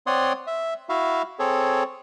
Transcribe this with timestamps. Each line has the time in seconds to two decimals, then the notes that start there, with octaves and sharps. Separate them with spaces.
0.07 C4 C#5 D5 F#5 C6 D#6
0.47 E5
0.89 E4 F#4 E5 F5
1.39 C4 G#4 A4 C#5